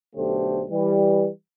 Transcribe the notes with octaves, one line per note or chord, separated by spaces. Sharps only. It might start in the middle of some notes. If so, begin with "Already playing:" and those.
B1 D3 A3 G4 C5
E3 G3